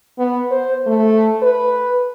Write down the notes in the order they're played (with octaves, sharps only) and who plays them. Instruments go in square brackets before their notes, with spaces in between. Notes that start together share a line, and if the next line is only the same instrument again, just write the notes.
[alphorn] B3
C5
A3
B4